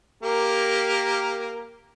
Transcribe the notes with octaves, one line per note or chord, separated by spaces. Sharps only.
A#3 G4 A#4